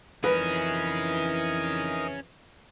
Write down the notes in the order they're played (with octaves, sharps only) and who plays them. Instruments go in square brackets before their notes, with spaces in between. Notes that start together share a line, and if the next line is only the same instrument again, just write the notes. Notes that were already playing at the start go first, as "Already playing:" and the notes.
[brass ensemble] F2 E3 [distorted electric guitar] C#4 G#4 [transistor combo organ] D#4 A#4 [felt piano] B4